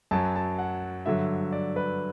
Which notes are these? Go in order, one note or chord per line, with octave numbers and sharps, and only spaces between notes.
F#2 F#3 A5
A5
F#5
G2 D3 F#3 E5
D5
B4